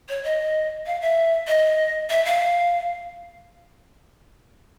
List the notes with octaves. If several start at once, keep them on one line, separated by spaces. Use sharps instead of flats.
C#5
D#5
F5
E5
D#5
E5
F5